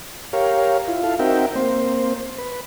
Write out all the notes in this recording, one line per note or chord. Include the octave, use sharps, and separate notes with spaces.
G4 A#4 C#5 F5
E4 F4
E4 A4 F5
C4 D#4 F#4 A#4 E5 G5
A#3 C4 C5
B4